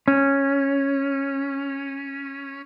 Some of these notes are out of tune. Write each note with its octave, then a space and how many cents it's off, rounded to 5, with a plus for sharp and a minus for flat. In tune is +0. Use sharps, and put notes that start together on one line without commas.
C#4 -5